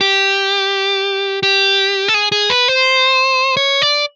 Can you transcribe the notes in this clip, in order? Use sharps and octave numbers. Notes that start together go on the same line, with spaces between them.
G4
G4
A4
G#4
G#4
B4
C5
C#5
D5